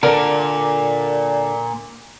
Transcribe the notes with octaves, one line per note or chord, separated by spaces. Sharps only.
A#2 D3 A#4